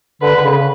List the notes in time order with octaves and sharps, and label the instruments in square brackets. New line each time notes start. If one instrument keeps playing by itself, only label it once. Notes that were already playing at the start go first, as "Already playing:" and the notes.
[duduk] D3 [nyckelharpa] B4
[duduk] D3
C#3